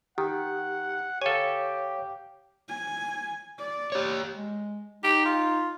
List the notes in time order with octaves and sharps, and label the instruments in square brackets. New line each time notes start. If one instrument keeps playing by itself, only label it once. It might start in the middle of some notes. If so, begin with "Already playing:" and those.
[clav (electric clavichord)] D#3 [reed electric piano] G4 [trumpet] F#5
[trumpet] G4 [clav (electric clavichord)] A4 G#5 [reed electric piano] C#5 F5
[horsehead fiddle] G#5
D5
[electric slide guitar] G4 C#5
[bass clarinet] G#3
[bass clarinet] D#4 [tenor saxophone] G4
[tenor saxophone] F4